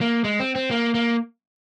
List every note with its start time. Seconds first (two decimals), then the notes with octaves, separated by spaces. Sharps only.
0.01 A#3
0.24 G#3
0.40 C4
0.56 C4
0.71 A#3
0.94 A#3